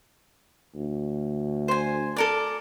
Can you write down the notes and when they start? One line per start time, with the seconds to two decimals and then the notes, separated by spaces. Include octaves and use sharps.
0.74 D2
1.68 C5 G#5
2.16 A4 A#4 D5